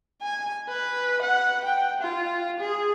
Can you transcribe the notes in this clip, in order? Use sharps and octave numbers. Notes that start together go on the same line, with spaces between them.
G#5
B4
F#5
G5
F4
G#4